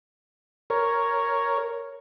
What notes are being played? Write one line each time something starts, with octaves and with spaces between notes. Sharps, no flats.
A#4 C#5